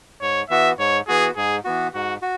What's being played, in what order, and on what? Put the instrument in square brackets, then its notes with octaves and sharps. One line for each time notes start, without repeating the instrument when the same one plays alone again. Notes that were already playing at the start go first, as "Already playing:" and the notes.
[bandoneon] G#2 [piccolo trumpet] C#5
[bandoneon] E3 B3 F#4 [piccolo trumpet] E5
[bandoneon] G#2 [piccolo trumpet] C#5
[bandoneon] E3 B3 F#4 [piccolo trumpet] G#4
[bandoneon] G#2 [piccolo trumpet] G#4
[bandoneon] E3 B3 F#4
[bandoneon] G#2 [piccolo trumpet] F#4
[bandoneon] F#4